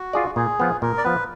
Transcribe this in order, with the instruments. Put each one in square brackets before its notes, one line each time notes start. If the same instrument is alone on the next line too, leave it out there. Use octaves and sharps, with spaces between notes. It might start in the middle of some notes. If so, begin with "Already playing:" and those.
Already playing: [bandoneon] F#4
[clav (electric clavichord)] F4 G#4 D5
[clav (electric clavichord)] A#2 [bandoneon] G#4
[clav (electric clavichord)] F3 B3
[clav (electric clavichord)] A#2 [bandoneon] A#4
[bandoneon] D5
[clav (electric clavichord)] F3 B3 [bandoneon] B4